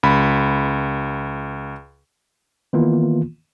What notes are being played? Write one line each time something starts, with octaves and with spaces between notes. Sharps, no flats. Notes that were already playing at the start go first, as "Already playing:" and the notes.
C#2 B5
D#3 E3 A#3 B3 F4